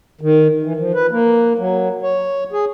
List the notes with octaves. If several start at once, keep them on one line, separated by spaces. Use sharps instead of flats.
D#3
E3
F3
B4
A#3
F#3
C#5
G#4